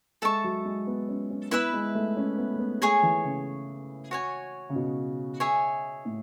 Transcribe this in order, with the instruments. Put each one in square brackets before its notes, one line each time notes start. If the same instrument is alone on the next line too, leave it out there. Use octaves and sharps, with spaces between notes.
[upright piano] G#3 [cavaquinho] A4 E5 A5 C#6
[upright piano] F#3
G#3
B3
C#4
C#4
[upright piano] B3 [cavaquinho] E4 B4 E5 B5
[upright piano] G#3
A3
C#4
B3
A3
B3
[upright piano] A3 [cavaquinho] G#4 C#5 G#5 C#6
[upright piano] E3
C#3
[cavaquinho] F#4 C#5 G#5
[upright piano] C#3
B2
[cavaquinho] G#4 C#5 E5 G#5
[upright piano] A2